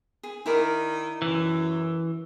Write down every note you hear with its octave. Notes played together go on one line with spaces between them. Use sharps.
G#4
D#3 E4 A#4 D5
F#2 E3